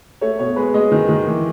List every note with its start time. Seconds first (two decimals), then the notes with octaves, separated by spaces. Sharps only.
0.21 A3 C#5
0.39 B2 C#5
0.56 G#3 B4
0.74 G#3 D#5
0.92 D#3
1.09 D#3
1.27 E3